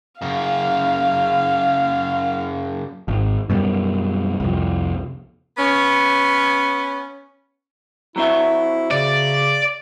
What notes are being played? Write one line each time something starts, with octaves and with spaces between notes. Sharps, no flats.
F#2 C#3 F5
G#1
F#2 B2 G3
C2 F2
B3 C#4
F#3 C4 E4 E5
C#3 D5